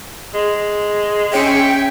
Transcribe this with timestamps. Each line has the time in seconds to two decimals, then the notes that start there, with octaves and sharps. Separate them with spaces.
0.34 G#3
1.32 C#4 C#5 E5 G5 G#5 B6 C#7